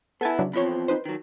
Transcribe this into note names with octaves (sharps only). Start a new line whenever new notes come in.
B3 E4 A4 G#5 A5
C#3 F#3 D4
E2 F3 C4 C#5 B5
D#4 B4 C5
D#3 F#3